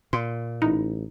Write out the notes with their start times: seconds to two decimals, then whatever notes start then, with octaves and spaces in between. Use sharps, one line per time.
0.13 A#2 C6
0.62 A1 D#4 E4